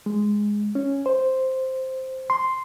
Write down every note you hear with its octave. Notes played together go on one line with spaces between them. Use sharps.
G#3
C#4
C5
C6